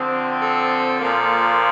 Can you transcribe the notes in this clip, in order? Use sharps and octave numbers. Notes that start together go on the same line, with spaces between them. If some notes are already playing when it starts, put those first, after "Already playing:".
Already playing: D3 F3 C4
A4
A#2 F3 A#3